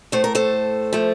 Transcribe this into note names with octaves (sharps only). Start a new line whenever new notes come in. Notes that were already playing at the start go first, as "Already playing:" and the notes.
A2 A3 C5
A#4
A4 C5
F3 A3